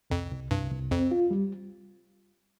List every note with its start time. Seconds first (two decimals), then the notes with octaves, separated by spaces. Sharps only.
0.10 C2 F2
0.31 C2
0.51 C2 G2
0.71 C2
0.91 F2 C4
1.11 F4
1.31 G3